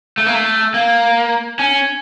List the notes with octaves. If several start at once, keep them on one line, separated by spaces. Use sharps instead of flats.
A3
A#3
A3
A#3
C#4